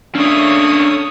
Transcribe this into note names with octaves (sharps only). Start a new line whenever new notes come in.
A3 A#3 C#4 D4 C#5 D#6